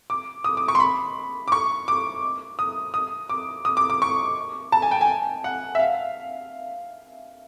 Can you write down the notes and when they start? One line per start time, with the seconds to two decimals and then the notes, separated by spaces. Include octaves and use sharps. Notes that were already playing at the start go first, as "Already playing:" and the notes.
0.10 D6
0.44 D#6
0.57 D6
0.68 C#6
0.75 C6
0.80 B5
1.48 D6
1.52 C#6
1.88 D6
2.59 D#6
2.94 D#6
3.29 D6
3.65 D#6
3.77 D6
3.90 D6
4.02 C#6
4.72 A5
4.82 G#5
4.91 G5
5.01 G#5
5.44 F#5
5.75 E5
5.79 F5